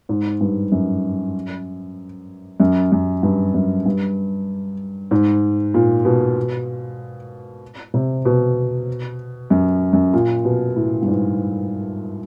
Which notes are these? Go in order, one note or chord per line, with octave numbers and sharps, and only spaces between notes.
G#2
G2
F#2
F#2
F#2
G2
F#2
G2
G#2
A#2
B2
C3
B2
F#2
F#2
A#2
B2
A2
G2
G#2